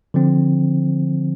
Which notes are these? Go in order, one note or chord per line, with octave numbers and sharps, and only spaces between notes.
D3 F3 C4